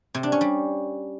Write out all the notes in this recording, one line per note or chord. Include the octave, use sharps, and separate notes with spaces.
C3
D4
C#4
G3